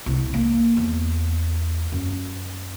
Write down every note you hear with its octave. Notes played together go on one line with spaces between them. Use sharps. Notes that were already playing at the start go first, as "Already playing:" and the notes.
C2
A#3
E2
F#2